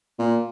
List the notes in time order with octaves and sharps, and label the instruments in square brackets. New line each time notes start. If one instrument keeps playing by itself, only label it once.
[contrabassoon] A#2